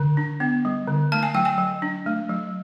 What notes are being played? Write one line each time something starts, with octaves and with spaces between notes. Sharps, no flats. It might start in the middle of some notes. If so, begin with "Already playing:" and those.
Already playing: D3
D4
B3
G3
D3
A3 A5
G#5
F#3 G5
G#5
F#3
D4
A3
F#3